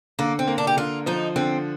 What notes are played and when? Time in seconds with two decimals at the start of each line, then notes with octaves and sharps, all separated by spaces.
0.19 D3 A#3
0.39 C4
0.47 A#3
0.58 D4
0.67 G4
0.77 D3 F4
1.06 F3 D#4
1.36 D3 C4